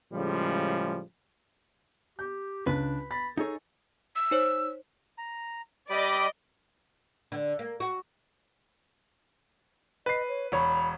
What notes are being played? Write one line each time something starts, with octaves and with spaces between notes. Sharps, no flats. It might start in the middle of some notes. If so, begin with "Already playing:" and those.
A2 C#3 F3 G3 G#3
G4 G6
C#2 D4 B4
B5 A6
D#4 G#4 A4 C#5
E6
D#4 C5 C#5
A#5
G3 G4 D5 D#5 B5 D6
D3
A#3
F#4
B4 D#5 C7
C#5
E1 C#5 B5